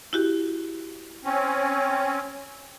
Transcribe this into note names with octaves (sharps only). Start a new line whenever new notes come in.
E4 F#4 G4
C4 C#4